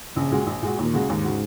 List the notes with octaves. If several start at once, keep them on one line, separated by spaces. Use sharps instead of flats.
A#1 C#3
A#2 G#3 F#4
A#1
A#2 G#3 F#4
D#2 A#2
C#3 G#3 F#4
D#2 G#2
C#3 G#3 F#4